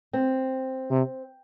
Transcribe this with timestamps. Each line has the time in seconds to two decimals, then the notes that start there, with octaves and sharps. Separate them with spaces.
0.13 C4
0.91 C3